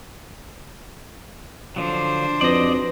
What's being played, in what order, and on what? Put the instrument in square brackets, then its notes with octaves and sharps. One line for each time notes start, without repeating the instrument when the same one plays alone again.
[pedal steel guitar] D3 F3 F#3 [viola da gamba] D4 C5
[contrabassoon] F2 [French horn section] G#2 F#4 B4 [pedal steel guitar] D5 D#5